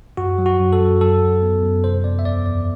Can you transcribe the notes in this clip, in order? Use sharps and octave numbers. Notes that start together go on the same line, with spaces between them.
F#2 F#4
F#3
F#4
F#2
A4
F#2
F#3 A4
F#2
B3
F#2
C3 C5
B3 D5
E5
E2 D5
E2 D5